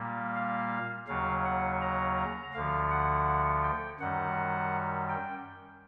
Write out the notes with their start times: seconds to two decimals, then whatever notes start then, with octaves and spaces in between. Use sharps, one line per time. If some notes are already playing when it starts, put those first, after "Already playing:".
Already playing: A#2 G3 A#3
0.35 F5
1.08 D#2 C#3 F#3 F5
1.45 F#5
1.81 A#5
2.18 A#5
2.54 D2 D3 F3 F5
2.91 F#5
3.63 G5
4.00 F#2 D#3 G3 F#5
5.09 G5